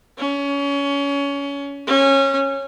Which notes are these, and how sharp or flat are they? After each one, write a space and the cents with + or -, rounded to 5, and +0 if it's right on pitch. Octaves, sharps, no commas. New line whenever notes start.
C#4 +25
C#4 -20